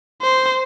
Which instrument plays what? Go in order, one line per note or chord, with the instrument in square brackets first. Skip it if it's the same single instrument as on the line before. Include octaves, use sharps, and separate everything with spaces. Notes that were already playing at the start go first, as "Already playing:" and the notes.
[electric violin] C5